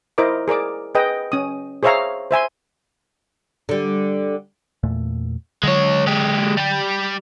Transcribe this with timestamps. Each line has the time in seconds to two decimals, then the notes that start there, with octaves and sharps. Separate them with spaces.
0.18 E4 A#4 C5 D#5 D6
0.48 G#4 A#4 D5 D6
0.95 G#4 B4 D#5 G5
1.32 C#4 D#6
1.83 G#4 C5 C#5 E5 F5 A#5
2.31 C5 E5 G#5 C6
3.69 D3 G3
4.83 E2 A#2 A3
5.63 D3 F#3 G#3 C#5
6.07 G#3 G4
6.57 G3 G4